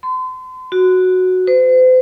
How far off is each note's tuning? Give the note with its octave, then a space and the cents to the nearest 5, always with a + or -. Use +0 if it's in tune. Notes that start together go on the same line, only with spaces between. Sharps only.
C6 -40
F#4 -5
C5 -40